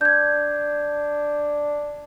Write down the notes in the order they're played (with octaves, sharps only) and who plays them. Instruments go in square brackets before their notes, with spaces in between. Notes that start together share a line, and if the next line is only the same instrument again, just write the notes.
[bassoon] D4 [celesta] G6 G#6